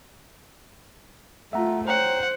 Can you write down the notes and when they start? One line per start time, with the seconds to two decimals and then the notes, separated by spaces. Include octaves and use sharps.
1.53 A3 F4 E5 F#5 A#5
1.88 C5 C#5 F#5 G5 A#5